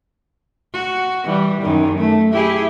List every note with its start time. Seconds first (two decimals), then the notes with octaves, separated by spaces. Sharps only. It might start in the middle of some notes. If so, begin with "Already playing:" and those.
0.73 F#4
1.24 E3 G3
1.62 F#2 D#3
1.98 A3
2.32 E4 G4 G#4